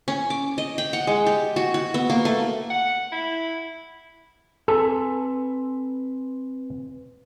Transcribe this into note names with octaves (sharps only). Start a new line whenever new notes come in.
C#4
D6
D#5
G5
F#5
G#3
G4
F#4
F#4
B3
A#3
A3
F#5
E4
C4 A4 B4 G#5